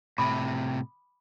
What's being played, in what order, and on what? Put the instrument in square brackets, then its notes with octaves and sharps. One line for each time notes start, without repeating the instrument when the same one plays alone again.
[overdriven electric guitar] A2 C3 [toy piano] B5 D6 D#6